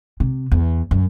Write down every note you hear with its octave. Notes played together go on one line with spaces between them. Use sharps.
C3
E2
F#2